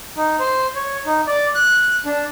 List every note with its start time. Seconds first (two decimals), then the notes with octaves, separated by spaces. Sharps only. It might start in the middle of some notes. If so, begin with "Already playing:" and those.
0.17 D#4
0.39 C5
0.75 C#5
1.06 D#4
1.27 D5
1.55 F#6
2.06 D4